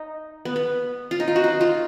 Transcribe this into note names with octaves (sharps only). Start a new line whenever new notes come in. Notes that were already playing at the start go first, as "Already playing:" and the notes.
Already playing: D#4
B3
B3
F4
D#4
F4
F#4
D#4
F4